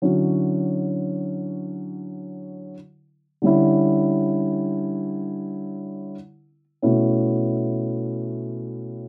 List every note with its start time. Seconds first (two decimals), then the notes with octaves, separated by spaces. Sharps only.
0.02 D3 F#3 C#4 E4
3.42 D3 G3 C#4 E4
6.82 B2 A3 C#4 E4